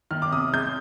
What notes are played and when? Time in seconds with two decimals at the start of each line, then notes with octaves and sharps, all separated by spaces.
0.11 D#3 F6
0.22 D6
0.32 C3 D#6
0.53 G#3 G6